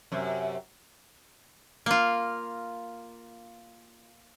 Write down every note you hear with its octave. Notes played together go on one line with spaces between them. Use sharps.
F#2 C3
A#3 F4